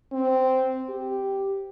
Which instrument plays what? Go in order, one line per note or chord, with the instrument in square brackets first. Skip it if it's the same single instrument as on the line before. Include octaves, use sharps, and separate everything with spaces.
[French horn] C4
G4